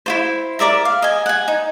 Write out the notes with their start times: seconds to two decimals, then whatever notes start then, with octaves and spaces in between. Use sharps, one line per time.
0.06 E4 F4 C5
0.59 A#4 D5 E5 A#5
0.85 F5
1.02 D#5 G#5
1.26 F#5 G#5
1.48 D#4